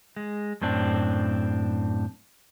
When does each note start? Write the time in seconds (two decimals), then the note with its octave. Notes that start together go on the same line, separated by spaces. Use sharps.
0.16 G#3
0.61 F#2 A2 C4 D4